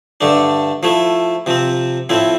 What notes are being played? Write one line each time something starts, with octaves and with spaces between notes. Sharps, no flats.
G2 D3 A3 D4
F3 A3 E4
C3 F3 C4
A2 F3 C4 E4